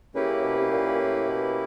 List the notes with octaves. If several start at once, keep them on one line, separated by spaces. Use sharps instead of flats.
C#3 A#3 C#4 E4 G4 B4
B2
C3
B2
A#2
A2
B2